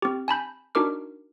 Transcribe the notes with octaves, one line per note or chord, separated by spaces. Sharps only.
C4 G4
G#5 A5 B5 G6
D4 D#4 F#4 A#4 D6 F6